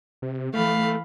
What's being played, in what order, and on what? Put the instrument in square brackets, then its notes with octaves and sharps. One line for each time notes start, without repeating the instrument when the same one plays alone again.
[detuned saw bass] C3
[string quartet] E3 F5 B5 [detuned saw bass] A3